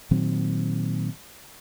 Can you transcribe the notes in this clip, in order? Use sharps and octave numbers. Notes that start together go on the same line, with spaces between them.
A#2 D#3 F#3 C4